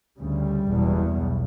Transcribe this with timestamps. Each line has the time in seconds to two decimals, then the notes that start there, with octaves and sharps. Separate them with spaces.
0.19 D2 C#3 G3
0.69 F#1 E2 B2
1.17 B1